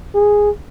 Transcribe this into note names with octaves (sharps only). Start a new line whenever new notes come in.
G#4